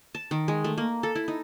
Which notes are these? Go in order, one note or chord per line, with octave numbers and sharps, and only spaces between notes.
A5
D#3
G#3
A3
A#3
A4
E4
D#4